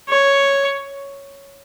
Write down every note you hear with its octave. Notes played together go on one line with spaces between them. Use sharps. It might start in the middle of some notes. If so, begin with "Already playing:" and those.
C#5